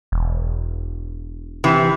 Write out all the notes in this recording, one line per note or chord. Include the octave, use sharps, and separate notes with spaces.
E1
C3 E3